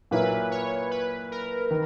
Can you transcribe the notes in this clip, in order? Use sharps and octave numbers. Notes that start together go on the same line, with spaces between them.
A#2 F#3 A#3 E4 B4
C#5
B4
A#4
D#3